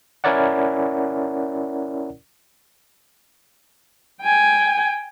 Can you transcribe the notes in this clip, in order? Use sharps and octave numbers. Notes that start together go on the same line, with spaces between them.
C#4 E4 A#4 C#5 D5 F#5
G5 G#5